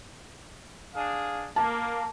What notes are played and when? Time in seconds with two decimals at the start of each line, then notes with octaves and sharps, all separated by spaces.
0.95 D4 G#4 F5
1.56 A#3 A5